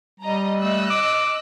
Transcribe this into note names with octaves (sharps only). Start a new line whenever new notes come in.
G3 D#5 A#5
A3 D#5 E6 F#6
D6